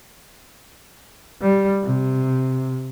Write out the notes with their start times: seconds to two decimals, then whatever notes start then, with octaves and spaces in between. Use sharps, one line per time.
1.41 G3
1.83 C3